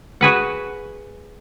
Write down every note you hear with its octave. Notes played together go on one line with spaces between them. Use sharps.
F#4 G#4 B4 F#5